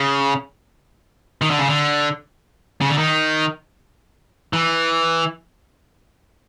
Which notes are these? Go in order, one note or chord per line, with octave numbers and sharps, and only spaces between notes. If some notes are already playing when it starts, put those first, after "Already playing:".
Already playing: C#3
D#3
D3
C#3
D3
C#3
D3
D#3
E3